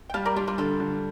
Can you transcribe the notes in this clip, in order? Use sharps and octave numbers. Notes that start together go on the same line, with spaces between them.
G5
G3 F5 A5
A#4 D5
G3 D4 F4
D4 F4
D3 F4 A4
D3